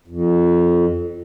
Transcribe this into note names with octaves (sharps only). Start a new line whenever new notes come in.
F2